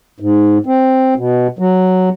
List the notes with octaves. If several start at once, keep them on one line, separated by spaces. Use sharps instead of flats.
G#2
C4
B2
F#3